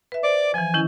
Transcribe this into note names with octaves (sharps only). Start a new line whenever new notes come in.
B4 E5
C5 D5 D6
E3 F3 G#5
D#3 C#4 E4